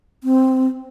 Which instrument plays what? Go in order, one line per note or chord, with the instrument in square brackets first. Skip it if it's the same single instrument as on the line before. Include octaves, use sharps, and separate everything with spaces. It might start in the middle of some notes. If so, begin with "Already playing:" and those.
[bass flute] C4